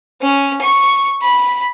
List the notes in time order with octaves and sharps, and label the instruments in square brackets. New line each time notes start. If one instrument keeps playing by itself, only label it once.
[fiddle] C#4
C#6
B5